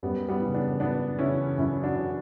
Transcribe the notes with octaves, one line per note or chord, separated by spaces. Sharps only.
F#2 G3 B3
G3 B3
C#3 E3
B3 D4
F#2 B3 D4
C#3 E3 C#4 E4
F#2 C#4 E4
D4 F#4
C#3 E3